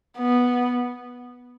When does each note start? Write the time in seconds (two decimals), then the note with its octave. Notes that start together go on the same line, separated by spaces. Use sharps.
0.18 B3